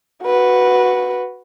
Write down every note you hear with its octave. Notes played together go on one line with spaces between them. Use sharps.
F#4 B4